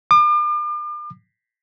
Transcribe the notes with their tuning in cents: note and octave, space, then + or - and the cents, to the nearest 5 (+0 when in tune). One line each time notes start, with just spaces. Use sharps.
D6 +40